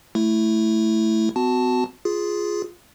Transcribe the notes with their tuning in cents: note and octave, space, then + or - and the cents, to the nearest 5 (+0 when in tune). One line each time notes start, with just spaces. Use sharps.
A3 +0 E4 +0
B3 +45 F#4 +0 A5 +0
F4 +0 G#4 +0